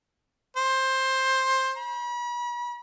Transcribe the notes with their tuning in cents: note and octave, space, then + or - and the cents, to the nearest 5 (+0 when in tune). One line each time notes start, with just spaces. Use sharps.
C5 +15
B5 -40